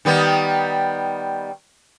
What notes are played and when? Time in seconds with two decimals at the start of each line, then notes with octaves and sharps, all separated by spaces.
0.05 D#3 G3 B3